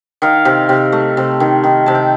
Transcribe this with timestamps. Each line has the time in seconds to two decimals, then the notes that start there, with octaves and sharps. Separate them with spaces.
0.22 D#3 F5
0.45 C3
0.69 C3
0.92 A3
1.17 C3
1.40 D#3
1.64 D#3
1.86 C3 A5
1.95 G5